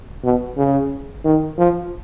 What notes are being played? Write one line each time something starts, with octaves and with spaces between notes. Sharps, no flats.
B2
C#3
D#3
F3